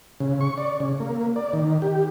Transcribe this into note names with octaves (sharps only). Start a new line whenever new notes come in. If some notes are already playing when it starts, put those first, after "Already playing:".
C#3
C#6
D5
C#3
A#3
D5
D#3
G4